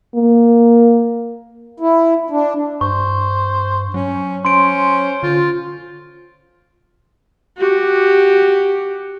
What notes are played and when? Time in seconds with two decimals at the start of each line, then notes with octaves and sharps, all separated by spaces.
0.15 A#3
1.80 E4
2.30 D4
2.81 G2 C5 C#6
3.94 F#3 C#4
4.45 C#4 C5 C6 D7
5.23 D3 F4
7.58 F#4 G4